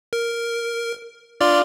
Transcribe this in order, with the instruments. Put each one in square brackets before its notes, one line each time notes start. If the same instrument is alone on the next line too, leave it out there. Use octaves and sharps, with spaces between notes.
[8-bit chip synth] A#4
[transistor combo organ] D4 F4 [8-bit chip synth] D5 C6